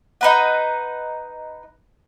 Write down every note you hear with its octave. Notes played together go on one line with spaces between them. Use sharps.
D#4 B4 F#5